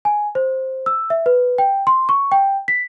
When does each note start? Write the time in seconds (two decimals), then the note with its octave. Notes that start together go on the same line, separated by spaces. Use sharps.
0.05 G#5
0.35 C5
0.86 E6
1.10 E5
1.26 B4
1.58 G5
1.87 C6
2.09 C#6
2.32 G5
2.68 B6